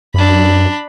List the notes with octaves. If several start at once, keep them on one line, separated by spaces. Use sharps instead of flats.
F#2 D4 B5